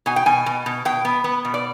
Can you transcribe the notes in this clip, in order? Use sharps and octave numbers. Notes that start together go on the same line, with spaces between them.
B2 G#5
G5
B2 G#5
B2
B2
B2 G5
B3
B3
B2
D5